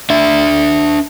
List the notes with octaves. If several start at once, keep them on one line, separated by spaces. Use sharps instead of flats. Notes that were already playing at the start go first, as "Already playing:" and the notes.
D4 E5